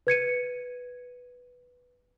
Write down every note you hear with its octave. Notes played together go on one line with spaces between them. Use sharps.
B4 G#6 C#7 D#7